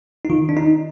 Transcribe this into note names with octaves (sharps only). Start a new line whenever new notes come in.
D#4
D#3 F4
D4
D#4